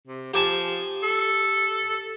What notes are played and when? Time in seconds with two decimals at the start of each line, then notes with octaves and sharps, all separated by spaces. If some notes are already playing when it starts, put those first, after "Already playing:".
0.07 C3
0.34 F3 G4 G#5 A5
1.03 A4